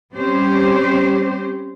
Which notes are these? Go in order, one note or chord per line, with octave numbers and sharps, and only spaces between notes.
G3 C4 C#4 G4 C5